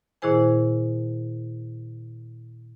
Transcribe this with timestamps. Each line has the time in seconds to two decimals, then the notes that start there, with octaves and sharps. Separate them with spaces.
0.22 A#2 D#3 E4 G#4 C5 G#5